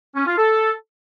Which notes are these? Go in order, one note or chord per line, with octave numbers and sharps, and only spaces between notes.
C#4
F4
A4